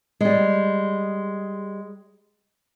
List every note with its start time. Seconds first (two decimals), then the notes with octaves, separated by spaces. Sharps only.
0.21 G3 G#3